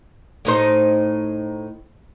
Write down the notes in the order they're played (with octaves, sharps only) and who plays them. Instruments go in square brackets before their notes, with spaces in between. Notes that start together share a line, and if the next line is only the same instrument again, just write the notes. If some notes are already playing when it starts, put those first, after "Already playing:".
[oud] A2 D#4 C5